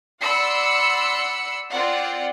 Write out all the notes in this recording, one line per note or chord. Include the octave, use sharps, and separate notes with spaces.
D5 F#5 B5 C6 E6 C#7
C4 F4 D5 F#5